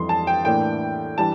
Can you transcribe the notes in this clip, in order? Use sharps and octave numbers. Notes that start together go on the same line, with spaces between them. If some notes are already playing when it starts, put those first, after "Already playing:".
Already playing: F2 E3 G3 C6
A5
G5
A2 E3 A#3 D4 G5
E3 G3 D4 A5